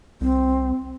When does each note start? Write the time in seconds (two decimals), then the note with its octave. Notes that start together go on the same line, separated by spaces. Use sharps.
0.21 C2 C4